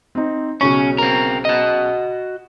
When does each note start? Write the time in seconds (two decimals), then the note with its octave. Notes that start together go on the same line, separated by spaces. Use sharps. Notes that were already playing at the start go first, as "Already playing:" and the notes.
0.15 C4 D#4
0.61 B1 C#3 C#4 C#6
0.98 C4 A#4
1.45 F#4 D#5